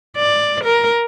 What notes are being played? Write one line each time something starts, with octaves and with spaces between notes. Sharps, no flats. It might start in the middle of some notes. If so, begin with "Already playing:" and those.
D5
A#4